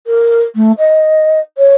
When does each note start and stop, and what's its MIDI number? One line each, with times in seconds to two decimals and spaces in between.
0.07 0.43 70
0.55 0.72 57
0.78 1.39 75
1.58 1.75 73